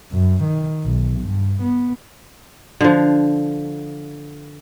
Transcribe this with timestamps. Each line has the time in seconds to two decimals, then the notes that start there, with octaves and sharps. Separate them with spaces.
0.12 F#2
0.44 D#3
0.84 B1
1.20 G2
1.62 B3
2.81 D3 F3